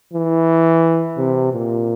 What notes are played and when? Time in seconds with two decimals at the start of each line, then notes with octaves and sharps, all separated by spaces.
0.14 E3
1.18 C3
1.53 A#2